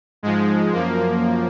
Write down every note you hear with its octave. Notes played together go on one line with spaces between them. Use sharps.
G#2 F3 G#3
F#2 F3 A#3